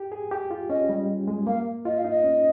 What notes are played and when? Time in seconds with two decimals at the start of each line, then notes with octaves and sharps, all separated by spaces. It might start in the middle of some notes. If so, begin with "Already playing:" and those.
Already playing: G4
0.12 G#4
0.31 G4
0.51 F4
0.70 C#4 D#5
0.89 G3
1.28 G#3
1.47 A#3 F5
1.85 F4 D#5
1.98 F5
2.04 D#4
2.11 D#5
2.24 C#4